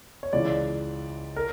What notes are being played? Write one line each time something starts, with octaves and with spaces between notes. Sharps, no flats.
C#5
C#2 C#3 E3 D5
A#4